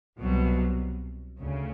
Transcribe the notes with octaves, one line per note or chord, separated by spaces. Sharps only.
C2 B2 F#3
D2 C#3